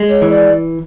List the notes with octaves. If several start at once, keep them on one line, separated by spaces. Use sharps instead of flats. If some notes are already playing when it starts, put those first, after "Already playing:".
Already playing: G#3
C#5
E3
D5